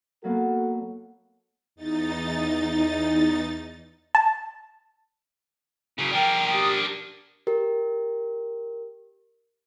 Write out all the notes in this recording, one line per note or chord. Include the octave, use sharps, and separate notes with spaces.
F#3 A#3 B3 F#4 A4
E2 D#4 A6
A5
C#3 F#3
D4 A#4 G5
G4 D#6
G4 A#4